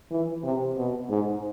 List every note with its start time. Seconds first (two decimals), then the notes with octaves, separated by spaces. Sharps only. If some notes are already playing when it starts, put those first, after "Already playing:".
0.11 E3
0.44 C3
0.77 B2
1.10 G#2